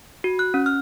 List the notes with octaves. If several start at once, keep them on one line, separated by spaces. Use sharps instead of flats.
F#4
F#6
C#4
F6